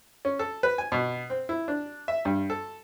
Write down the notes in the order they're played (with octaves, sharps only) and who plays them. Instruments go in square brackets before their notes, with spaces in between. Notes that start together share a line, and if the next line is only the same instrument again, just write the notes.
[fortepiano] C#4
A4
B4
G#5
B2
C4
E4
D4
E5
G2
A4